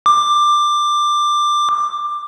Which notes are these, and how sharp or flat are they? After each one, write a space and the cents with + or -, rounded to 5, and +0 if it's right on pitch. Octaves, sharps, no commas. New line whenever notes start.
D6 +15